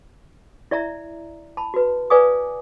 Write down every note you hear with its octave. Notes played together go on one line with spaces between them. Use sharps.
E4 D5 E5 A#5
A5 B5
F#4 B4
B4 D5 F5 G#5 D6 D#6